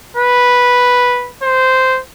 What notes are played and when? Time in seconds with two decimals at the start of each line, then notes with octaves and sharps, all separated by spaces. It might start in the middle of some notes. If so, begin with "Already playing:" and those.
0.17 B4
1.43 C5